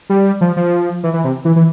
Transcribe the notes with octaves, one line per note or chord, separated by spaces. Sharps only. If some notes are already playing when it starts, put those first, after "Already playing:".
G3
F3
F3
E3
E3
C3
E3
E3